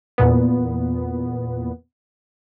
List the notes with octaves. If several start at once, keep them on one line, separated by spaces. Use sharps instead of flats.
E2 A#2 B3